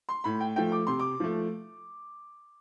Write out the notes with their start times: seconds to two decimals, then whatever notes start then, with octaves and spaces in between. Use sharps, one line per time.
0.09 C6
0.24 A2 B5
0.40 G5
0.56 F3 A3 G5
0.72 D6
0.87 C3 C6
0.99 D6
1.20 F3 A3